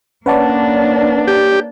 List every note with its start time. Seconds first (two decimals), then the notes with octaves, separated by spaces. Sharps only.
0.26 A#3 C#4 D4 B4 C#5 D5 F#5 A5
1.27 G4